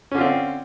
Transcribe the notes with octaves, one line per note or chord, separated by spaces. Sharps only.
D3 C4 C#4 F4